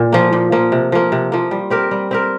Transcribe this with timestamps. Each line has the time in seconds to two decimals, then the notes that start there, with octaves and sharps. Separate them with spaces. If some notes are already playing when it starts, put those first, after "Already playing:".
Already playing: A#2
0.13 F3 A#3
0.33 A#2
0.52 F3 A#3
0.72 C3
0.92 F3 A#3
1.12 C3
1.32 F3 A#3
1.51 G3
1.70 C4 G4 A#4
1.91 G3
2.11 C4 G4 A#4